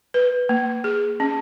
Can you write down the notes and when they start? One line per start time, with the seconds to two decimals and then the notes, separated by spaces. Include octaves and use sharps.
0.14 B4
0.49 A#3
0.84 G#4
1.20 C#4